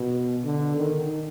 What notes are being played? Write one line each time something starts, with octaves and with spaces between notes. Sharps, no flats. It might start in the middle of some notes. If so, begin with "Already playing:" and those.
Already playing: B2
D3
D#3